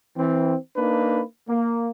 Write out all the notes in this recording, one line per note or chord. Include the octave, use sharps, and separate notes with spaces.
E3 C4
A#3 D4 D#4 B4
A#3